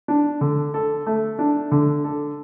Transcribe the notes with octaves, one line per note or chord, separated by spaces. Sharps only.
D4
D3
A4
A3
D4
D3
A4